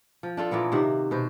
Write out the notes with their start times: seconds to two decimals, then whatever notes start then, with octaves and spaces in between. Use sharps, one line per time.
0.23 F3
0.37 D4 F4 A4
0.51 A#2 E3 A#3 B3
0.72 C3 D#3 F#4 E5
1.11 B2 B4 C5